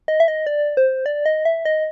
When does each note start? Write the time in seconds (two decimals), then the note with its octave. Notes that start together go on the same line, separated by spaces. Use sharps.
0.08 D#5
0.20 E5
0.28 D#5
0.47 D5
0.77 C5
1.06 D5
1.26 D#5
1.45 E5
1.65 D#5